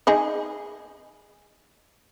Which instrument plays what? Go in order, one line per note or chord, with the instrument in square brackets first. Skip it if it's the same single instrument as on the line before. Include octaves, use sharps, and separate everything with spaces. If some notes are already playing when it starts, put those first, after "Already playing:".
[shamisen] D#4 G#4 D#5